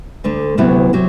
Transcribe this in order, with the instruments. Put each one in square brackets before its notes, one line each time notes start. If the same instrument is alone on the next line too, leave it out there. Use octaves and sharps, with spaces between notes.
[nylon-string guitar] D2 D3 A3
D2 C3 F#3 B3 E4
C3 F#3